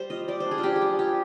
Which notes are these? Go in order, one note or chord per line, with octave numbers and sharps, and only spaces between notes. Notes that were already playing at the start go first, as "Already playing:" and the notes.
Already playing: G3 C5
F4 D#5
G3 D5
C5
D4
G#4
F4
G3 G4
G#4
G3
F4 G4